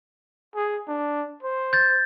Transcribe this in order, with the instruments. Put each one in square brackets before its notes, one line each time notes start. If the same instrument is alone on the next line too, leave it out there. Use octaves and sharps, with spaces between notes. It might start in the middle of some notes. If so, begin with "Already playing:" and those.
[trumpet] G#4
D4
C5
[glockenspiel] G6 A6